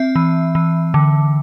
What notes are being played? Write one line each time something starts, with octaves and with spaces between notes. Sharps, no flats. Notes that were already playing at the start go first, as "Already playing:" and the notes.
Already playing: C4 E5
E3
E3
D3